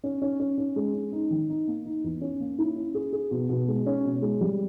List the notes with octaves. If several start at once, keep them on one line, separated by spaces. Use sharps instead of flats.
C#4
C#4
C#4
C#4
G#3
C#4
D#4
D#3
D#4
A#3
D#4
E2
C#4
A#3
E4
C#4
G#4
G#4
B2
B2
G#3
C#4
B2
G#3
G3